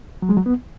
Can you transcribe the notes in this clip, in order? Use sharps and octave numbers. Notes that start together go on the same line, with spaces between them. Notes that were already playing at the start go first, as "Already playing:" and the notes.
F#3
G#3
F#3
B3